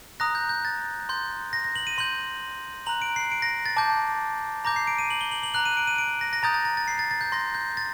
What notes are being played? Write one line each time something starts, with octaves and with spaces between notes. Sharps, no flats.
A#5 D#6 F#6 A#6
G6
G6
A6
C6 G6
A#6
A#6
F#7
D#7
C6 G6 F#7
A#5 F#6 F#7
D7
C7
D7
A#6
A6
A5 D6 G6
A#5 D6 G6 A#6
C7
D7
D#7
F#7
G7
F#7
F#7
A#5 F#6 F#7
D#7
D7
D#7
D7
A#6
A#6
A#5 D#6 G6 A6
A6
A6
A6
C7
A6
A6
G6
C6 G6 A#6
G6
A6